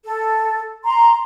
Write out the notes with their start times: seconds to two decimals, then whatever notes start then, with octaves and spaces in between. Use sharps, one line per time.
0.04 A4
0.83 A#5 C6